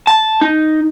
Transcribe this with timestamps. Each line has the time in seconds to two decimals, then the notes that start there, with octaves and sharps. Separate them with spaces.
0.07 A5
0.41 D#4